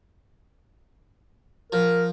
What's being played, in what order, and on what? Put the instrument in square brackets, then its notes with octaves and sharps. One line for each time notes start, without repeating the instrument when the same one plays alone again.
[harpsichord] F3 [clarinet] A#4